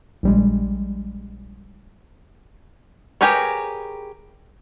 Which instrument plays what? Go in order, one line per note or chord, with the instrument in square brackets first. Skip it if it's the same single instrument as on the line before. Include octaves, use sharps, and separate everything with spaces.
[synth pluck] A#1 G3 G#3
[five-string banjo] G4 G#4 A#4 B4 C#5